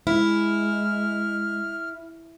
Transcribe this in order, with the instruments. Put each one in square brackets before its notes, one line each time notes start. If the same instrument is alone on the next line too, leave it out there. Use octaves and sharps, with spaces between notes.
[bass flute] G#3 [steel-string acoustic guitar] E4 [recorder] F6